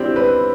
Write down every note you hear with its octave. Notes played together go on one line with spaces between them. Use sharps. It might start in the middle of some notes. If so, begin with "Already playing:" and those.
Already playing: C4 D4 E4 G4
B4